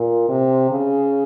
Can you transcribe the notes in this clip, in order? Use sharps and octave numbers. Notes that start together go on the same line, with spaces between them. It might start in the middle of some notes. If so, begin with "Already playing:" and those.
Already playing: A#2
C3
C#3